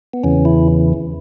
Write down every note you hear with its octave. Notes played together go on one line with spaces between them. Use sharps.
B3
E2 C#3 E3 C#4
E4